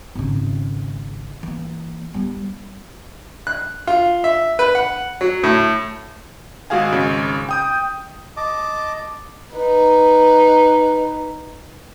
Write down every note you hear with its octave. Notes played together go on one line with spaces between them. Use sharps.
G#1 C#3
E3 A#3
G3 B3
F#6
F4
E5
B4
F#5
F#3
A2
G#1 G#3 F#4 G#4 F5 G#5
G#1 C#3 G#3
G5 D#6 G6
D#5 A5 D6
D#4 B4